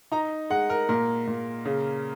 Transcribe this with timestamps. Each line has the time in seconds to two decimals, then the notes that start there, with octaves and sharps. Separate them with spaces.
0.12 D#4 A#5
0.50 G#3 F#5
0.70 A#4
0.89 A#2 A#4
1.27 A#2
1.65 C#3